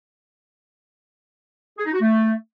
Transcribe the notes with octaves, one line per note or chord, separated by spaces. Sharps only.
G#4
D#4
F#4
A3